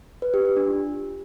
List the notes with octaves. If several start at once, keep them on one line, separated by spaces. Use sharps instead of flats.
B4
G4
G4
D4
F4